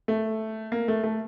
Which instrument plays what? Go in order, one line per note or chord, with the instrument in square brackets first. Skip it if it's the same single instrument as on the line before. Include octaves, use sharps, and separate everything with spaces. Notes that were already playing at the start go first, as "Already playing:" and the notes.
[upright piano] A3
A#3
A3
A3